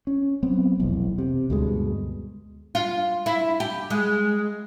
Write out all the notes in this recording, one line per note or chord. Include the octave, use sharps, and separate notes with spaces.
C#4
F#3 B3 C4
F1 B1 E2
C3
D2 G2 B2 G#3
F4
E4
G4
G#3